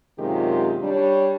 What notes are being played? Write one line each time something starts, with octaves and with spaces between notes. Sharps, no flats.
F#2 C3 D#3 G#3 F4 G4
G3 D4 C#5